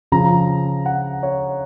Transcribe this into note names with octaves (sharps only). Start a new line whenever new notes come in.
C#3 F3 A#5
F#5
C#5